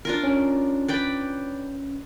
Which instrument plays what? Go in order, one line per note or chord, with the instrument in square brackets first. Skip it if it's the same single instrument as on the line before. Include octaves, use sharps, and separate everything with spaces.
[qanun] D4 F4 A#4
[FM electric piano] C#4
[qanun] B4 D5 G5